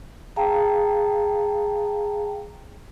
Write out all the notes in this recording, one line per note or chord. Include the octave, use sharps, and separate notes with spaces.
G#4 F5 G5 A5 A#5